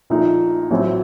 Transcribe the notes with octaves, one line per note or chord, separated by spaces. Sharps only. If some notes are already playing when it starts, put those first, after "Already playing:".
A#1 A#2 A3 D#4
A1 A2 F#3 C4